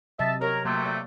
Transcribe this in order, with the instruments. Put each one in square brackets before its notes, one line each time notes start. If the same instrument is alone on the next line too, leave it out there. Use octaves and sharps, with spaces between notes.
[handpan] C3 F#3 D#5 [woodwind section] E5 A5
[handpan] G4 C#5 [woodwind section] A#4
[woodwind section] C3 F#3 A3 [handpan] A#3
[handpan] D5